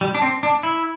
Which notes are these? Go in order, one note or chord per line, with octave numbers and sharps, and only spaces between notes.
G3
D4
C4
D4
E4